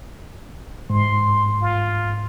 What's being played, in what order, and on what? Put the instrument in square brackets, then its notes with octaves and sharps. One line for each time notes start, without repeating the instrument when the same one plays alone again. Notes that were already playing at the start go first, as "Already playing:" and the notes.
[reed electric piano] G#2 [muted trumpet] C6
[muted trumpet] F4